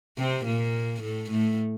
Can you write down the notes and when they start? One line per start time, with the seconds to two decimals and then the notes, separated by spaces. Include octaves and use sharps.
0.18 C3 C4
0.46 A#2 A#3
1.02 A2 A3
1.31 A2 A3